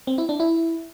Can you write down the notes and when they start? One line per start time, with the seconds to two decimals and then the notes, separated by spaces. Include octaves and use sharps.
0.07 C4
0.18 E4
0.29 D4
0.40 E4